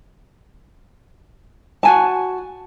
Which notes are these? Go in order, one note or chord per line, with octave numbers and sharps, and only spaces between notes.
F#4 G#5 A5